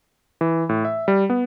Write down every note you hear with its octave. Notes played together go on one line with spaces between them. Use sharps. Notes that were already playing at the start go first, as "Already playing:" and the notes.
E3
A2
E5
G3
B3